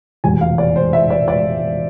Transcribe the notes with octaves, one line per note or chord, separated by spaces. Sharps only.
F1 E2 B2 G#5
F5
D5
C5
E5
D5
D5